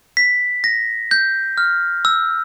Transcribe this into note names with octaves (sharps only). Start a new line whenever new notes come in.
B6
A#6
G6
F6
E6